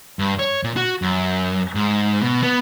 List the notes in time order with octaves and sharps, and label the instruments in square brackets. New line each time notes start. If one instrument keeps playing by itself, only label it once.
[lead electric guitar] G2
C#5
A#2
F#4
F#2
G#2
B2
B3